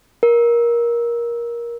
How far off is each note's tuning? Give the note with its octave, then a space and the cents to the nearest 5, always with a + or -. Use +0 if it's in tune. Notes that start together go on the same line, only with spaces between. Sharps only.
A#4 +20